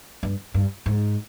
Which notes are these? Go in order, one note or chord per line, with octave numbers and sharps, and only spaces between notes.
G2
G2
G#2